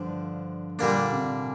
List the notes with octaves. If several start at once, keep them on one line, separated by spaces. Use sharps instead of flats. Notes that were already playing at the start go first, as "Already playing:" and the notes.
Already playing: G2 D3 F3
A#2 D3 G3 A#3 D4
C3